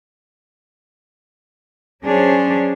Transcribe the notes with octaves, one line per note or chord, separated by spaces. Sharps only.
F#3 C#4 D4 G#4 C5 C#5